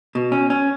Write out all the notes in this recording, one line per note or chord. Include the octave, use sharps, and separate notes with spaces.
B2
C#4
C#4